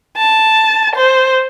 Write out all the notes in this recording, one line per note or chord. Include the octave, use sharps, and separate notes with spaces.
A5
C5